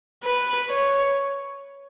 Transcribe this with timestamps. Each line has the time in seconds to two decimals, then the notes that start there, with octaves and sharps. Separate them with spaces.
0.24 B4
0.70 C#5